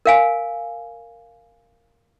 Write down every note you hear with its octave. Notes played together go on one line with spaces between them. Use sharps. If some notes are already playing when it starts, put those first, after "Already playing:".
A#4 F5 G#5